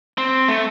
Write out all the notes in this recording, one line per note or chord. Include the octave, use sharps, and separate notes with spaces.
C4
A3